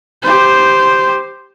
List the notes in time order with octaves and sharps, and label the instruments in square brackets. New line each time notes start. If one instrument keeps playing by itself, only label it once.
[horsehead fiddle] G4 C5